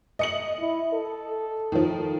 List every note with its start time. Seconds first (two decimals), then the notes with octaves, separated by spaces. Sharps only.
0.19 D#5 C#7 F#7
0.59 E4
0.93 A4
1.72 D#3 F3